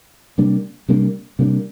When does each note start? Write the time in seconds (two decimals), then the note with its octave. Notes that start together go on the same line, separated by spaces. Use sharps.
0.38 C3 G3 A#3 D4
0.89 C3 G3 A#3 D4
1.39 C3 G3 A#3 D4